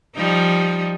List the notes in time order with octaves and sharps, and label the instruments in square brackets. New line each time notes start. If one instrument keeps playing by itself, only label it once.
[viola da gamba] F3 G3 D#4